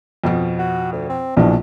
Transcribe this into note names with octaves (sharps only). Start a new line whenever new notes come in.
F2 B2 F3
F#4
D2
C4
A#1 B2 E3 D4